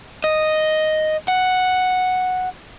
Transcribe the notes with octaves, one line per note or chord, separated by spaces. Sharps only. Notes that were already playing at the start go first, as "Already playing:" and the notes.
D#5
F#5